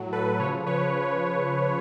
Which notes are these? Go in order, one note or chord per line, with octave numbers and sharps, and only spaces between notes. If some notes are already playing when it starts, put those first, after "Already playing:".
Already playing: A2 F#3
A4 B4
C#3 F3 B4 C#5
B4 C#5